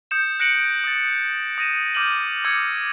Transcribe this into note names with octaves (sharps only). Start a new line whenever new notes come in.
D#6 G6 C#7 E7
F#6 A#6 C#7 D7 F#7
D#6 A6
D#6 A#6 D#7 E7
D6 F6 G6 A6 D#7 F#7
D6 E6 G#6 C#7